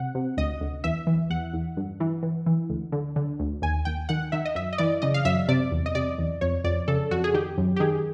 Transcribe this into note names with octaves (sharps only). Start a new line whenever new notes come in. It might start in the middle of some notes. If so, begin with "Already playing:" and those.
Already playing: C3 F#5
C3
D2 D#5
D2
E2 E5
E3
E2 F#5
E2
G2
E3
E3
E3
D2
D3
D3
D2
D#2 G#5
D#2 G5
D#3 F#5
D#3 E5
D#5
F#2 E5
D#5
E3 D5
C#3 D#5
F5
F#2 E5
C3 D5
E2
D#5
C3 D5
E2
F2 C#5
F2 D5
C#3 A4
F2 F#4
G#4
D#3 G4
F#2
G4
D#3 G#4